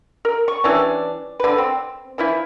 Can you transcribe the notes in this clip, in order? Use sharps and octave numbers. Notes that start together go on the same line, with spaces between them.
A#4
C#6
E3 G3 C#4 D4
D3 B4
C4
E3 F3 E4